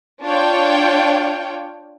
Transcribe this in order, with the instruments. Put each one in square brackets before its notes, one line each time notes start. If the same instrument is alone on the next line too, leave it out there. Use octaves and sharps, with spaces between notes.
[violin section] D4 F4 C#5 G5